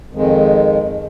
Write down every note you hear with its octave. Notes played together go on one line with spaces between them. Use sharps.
F2 D#3 G#3